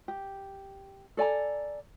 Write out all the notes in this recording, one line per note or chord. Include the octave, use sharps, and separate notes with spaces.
G4
A4 D5 G#5 A#5